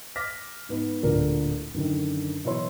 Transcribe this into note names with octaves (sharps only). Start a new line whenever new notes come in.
D6 F6 A#6 B6
G#2 B3 D#4
D1 A#2 D3 A#4 D5
F#2 D3 D#3
B2 E3 F#3 E4 C#5 C6